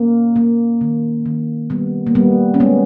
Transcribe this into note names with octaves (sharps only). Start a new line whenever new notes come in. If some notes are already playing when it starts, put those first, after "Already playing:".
Already playing: A#3 C#4
A#3
D#3
D#3
G3 B3
A#3
G3 B3
C#4
G#3 B3